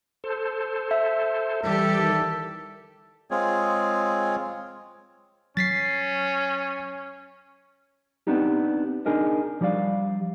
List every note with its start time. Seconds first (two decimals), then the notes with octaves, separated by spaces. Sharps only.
0.24 A4 C5
0.91 E5
1.63 E3 G3 G4 A4
1.99 D#3
3.31 G#3 C4 F4 G#4 C#5
5.57 F#3 C#4 A6 B6 C7
8.27 B3 C4 D4 D#4 G4
9.06 D4 D#4 G#4 A#4 D#5
9.61 F3 G3 G4 D5 F5